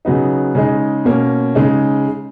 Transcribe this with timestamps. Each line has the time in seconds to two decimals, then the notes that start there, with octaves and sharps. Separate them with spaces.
0.05 C#3 F#3 B3 D#4
0.55 C#3 G#3 D#4
1.05 B2 A#3 C#4
1.55 C#3 G#3 D#4